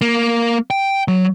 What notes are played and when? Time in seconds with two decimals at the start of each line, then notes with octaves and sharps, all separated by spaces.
0.01 A#3
0.70 G5
1.08 F#3